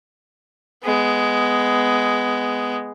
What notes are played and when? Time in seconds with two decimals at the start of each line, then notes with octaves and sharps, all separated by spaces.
0.84 G#3 B3